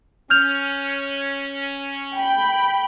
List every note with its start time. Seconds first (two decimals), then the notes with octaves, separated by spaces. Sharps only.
0.30 C#4 F6 G6 F7
2.14 G5 B5